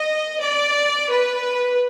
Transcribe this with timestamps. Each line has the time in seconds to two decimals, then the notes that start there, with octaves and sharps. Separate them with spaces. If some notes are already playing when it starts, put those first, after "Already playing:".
Already playing: D#5
0.41 D5
1.10 B4